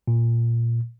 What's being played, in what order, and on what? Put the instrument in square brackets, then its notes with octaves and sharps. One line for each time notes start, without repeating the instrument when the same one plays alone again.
[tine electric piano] A#2